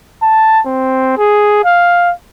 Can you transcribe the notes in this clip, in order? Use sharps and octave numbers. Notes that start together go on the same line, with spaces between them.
A5
C4
G#4
F5